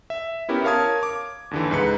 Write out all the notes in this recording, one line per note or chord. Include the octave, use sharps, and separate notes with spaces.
E5
B3 C#4 E4 G4 A#4
A#4 C#5 F5 A5 D#6 G#6
D6
D#2 D3 E3
C#2 G#2 B4 C#7